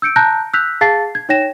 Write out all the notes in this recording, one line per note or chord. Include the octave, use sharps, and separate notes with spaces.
E6 G6 C#7 D7
A5 A#5 F#6 G6 A#6
E6 F#6 G6 B6 F7
G#4 F5 A5 A6 C7
G#6
D#4 C#5 G5 A#6 E7